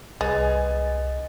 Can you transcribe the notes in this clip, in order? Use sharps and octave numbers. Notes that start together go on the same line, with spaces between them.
C2 G#3 B4 D#5 G#5 A6